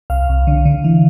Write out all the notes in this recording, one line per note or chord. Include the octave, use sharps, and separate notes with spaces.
C2 F5
C2
D3
D3
E3